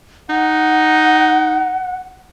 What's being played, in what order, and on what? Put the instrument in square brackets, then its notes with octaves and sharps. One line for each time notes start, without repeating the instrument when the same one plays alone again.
[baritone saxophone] D#4 [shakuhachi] F#5